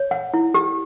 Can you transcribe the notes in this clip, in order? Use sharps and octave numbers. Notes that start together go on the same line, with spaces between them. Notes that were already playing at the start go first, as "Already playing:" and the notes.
Already playing: C#5
F#5
E4
G4